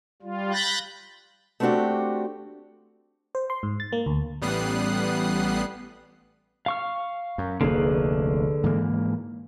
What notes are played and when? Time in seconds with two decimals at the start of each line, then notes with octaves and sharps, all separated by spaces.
0.22 G3 F4
0.52 B5 F#6 G6 A6 A#6
1.60 A3 B3 C4 D4 F#4 G4
3.35 C5
3.50 C6
3.63 G#2
3.80 A6
3.93 A#3
4.06 D2
4.42 A1 G3 B3 D#6 F#6 C7
6.66 F5 C#6 F6
7.38 F#2
7.61 F1 D2 D3 A#3 G#4 B4
8.63 G#2 E3 A#3